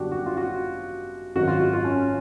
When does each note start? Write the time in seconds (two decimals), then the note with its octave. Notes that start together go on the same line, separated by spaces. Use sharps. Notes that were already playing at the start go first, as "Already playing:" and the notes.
Already playing: G1 F#2 D3 D4 F#4 G4
0.12 F#4
0.26 F4
0.37 F#4
1.36 G#1 F#2 D#3 F#4
1.48 F4
1.60 F#4
1.73 F4
1.85 C#4